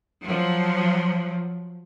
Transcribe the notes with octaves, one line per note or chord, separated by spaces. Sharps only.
F3 F#3